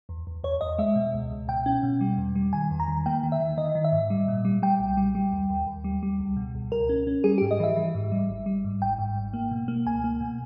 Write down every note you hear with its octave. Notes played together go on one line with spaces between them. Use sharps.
E2
E2
E2 C#5
E2 D#5
G#3 E5
B2
C#2
C#2
B2 G5
C#4
B2
G3
E2
G3
D#3 G#5
E2
A#5
D#3
A#3 G5
D#3
E5
D#3
D#3 D#5
D#3
E5
G#2
G3
A#2
G3
G3 G5
B1
G3
G3
D#2
D#2
D#2
G3
G3
C#2
B2
C#2
C#2 A#4
C#4
C#4
G3 G#4
G#2 G4
D#5
E3 E5
E3
G#2
G3
G#1
G3
G#2
G#1 G5
G#2
G#1
A#3
B2
A#3
C#2 G#5
A#3
B2